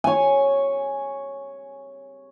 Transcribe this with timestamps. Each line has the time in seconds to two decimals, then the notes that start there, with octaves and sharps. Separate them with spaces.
0.04 C#5 G#5